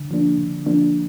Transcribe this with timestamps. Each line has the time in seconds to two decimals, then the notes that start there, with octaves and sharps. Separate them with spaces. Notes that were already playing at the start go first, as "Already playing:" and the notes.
Already playing: D3
0.11 F3 A#3 D4
0.38 D3
0.66 F3 A#3 D4